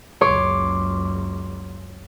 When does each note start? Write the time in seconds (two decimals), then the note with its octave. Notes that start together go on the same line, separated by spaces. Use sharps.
0.21 F#1 C#2 C#5 C6 D6